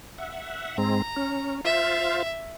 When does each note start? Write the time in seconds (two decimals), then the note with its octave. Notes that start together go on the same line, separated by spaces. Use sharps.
0.18 E5 F#5
0.78 G#2 G#3 C4 A#5
1.16 C#4
1.65 F4 C5 E5 F5